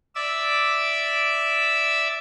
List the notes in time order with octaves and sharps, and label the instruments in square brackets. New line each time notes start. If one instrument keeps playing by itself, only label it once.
[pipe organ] D5 E5 D6 E6